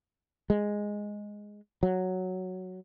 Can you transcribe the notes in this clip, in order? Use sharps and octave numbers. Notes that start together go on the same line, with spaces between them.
G#3
F#3